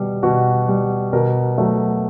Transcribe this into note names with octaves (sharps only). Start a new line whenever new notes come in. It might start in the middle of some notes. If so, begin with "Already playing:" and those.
Already playing: B2 G3
B2 F#4
G3
B2 A#4
F#3 A3